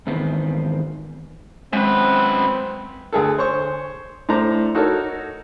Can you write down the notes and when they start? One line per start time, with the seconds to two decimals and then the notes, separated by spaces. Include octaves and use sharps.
0.07 E2 G#2 D#3 B3 C4
1.73 F#2 G#3 C4 B4
3.13 D2 G#4 A4
3.38 C5 C#5 C#6
4.29 A2 A3 D4 C5 A#5
4.75 D#4 F#4 A4 A#4 C#5